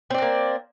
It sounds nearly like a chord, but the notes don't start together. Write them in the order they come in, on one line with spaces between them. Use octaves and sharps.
C4 D5 D4 A#3